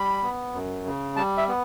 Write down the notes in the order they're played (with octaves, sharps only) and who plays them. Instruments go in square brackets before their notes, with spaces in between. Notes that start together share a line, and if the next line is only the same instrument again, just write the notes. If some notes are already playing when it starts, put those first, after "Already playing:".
Already playing: [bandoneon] G3 B5
B3
F#2
C#3
G3 A5
E5
B3